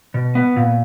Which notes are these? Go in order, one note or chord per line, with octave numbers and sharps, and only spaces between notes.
B2
B3
A#2